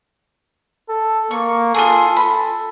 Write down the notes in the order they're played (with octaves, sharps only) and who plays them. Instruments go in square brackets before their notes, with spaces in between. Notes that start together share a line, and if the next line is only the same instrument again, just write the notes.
[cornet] A4
[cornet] A#3 [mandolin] C#6
[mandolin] F4 F#4 G#4 [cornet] A4
[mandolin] B5